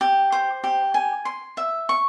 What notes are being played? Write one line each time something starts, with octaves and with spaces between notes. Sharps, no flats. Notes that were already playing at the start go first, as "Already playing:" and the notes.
G4
C5
G4
G#5
C6
E5
C#6